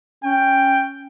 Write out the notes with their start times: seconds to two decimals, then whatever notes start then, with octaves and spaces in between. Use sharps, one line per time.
0.24 C#4 G5